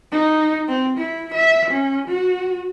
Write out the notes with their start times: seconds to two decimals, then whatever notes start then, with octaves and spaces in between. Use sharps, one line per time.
0.12 D#4
0.68 C4
0.97 E4
1.34 E5
1.71 C#4
2.08 F#4